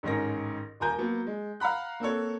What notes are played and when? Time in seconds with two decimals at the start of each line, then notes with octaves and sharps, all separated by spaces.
0.03 A1 G#2 D#3 C#4 A#4 A#6
0.80 D#1 F4 A#4 G#5 A#5 G6
0.98 F#3 A#3 B3
1.27 G#3
1.60 F5 F#5 A#5 B5 F#6
2.00 A#3 C4 A4 C#5